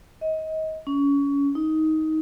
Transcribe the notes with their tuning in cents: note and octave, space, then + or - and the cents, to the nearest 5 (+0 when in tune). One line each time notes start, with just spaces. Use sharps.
D#5 +25
C#4 +25
D#4 +15